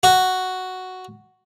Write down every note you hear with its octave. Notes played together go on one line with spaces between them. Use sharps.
F#4